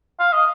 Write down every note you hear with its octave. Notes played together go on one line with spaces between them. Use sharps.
F5
D#5